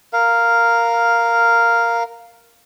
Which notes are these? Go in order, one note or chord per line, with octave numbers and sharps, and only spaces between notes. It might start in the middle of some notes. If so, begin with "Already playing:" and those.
A#4 F5